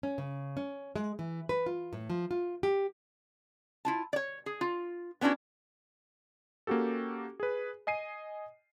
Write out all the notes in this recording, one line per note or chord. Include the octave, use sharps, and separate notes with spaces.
C#4
C#3
C#4
G#3
E3
B4
F4
A2
F3
F4
G4
E4 F4 A5
C#5 D5
G#4
F4
B3 C#4 D4 E4 F#4
A#3 C#4 F#4 G4 A4
G#4 B4
D#5 G#5 C7 D#7